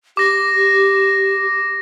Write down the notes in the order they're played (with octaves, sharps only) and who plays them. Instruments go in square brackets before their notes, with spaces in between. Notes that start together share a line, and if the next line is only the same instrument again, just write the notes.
[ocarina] G4 [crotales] D6 A#6